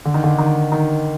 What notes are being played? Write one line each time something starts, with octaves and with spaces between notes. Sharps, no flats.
D3
D#3
D3
D#3
D#3